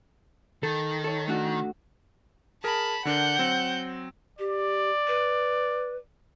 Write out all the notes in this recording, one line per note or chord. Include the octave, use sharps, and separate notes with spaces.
D#3 A4
A4 C#5
A3 D4 F#4
G#4 A#4 A5 B5
D3 D4 A#4 F#5 G6
F#3 C4
G4 D5
B4